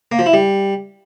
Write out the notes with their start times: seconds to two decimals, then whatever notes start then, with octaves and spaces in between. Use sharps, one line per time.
0.12 A#3
0.19 F3
0.26 E4
0.33 G3